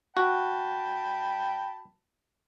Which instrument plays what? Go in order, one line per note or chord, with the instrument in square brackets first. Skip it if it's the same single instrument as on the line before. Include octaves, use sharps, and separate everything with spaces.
[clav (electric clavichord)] F#4 [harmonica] G5 A5 B5